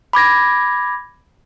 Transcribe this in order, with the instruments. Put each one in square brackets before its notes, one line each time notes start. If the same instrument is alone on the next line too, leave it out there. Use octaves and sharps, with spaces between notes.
[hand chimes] B5 D6 G#6 A#6